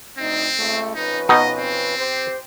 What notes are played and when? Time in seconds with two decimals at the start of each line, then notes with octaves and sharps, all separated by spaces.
0.18 D2 C4 D#4
0.57 C#2 A3
0.95 F2 C#4 D#4 B4
1.29 B2 D#4 D#5
1.58 C4
1.97 G4 C5